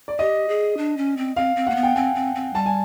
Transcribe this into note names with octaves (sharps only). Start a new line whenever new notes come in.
D5
G4 D#5
G#4
D4
C#4
C4
C4 F5
C4
A#3 F#5
B3
G5
C4 G#5
C4
C4
G3 A5
G#5